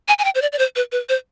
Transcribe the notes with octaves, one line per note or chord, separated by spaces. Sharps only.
G#5
G#5
G5
C5
D5
D5
C5
B4
B4
C5